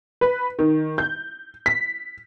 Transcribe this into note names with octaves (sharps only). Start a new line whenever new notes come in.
B4
D#3
G6
B6